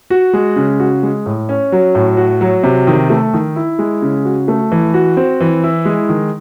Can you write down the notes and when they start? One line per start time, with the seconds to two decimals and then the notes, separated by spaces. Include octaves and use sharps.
0.10 F#4
0.33 G#3
0.56 C#3
0.80 F#4
1.03 G#3
1.26 A2
1.49 C#4
1.72 F#3
1.95 A2
2.17 F#4
2.41 F#3
2.63 C3
2.87 D#3
3.10 A3
3.33 D#3
3.56 E4
3.79 G#3
4.02 C#3
4.25 F#4
4.48 A3
4.71 E3
4.94 F#4
5.17 C4
5.40 E3
5.63 E4
5.85 G#3
6.09 D#3